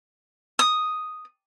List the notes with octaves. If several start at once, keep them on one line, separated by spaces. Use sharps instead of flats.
D#6